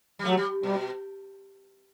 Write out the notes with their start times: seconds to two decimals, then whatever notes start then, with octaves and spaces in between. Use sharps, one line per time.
0.19 G3
0.25 F#3 A3
0.37 G3
0.63 B2 G3